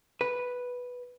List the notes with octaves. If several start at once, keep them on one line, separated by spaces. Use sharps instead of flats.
B4